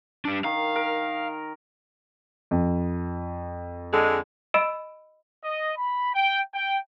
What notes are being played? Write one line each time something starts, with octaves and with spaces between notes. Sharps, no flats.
G3 D4
D#3 F5
A#4
F2
D3 G#3
D#5 B5 E6 D7 E7
D#5
B5
G5
G5